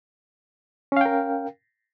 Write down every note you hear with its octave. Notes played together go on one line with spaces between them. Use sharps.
C#4 A#4 F5 G5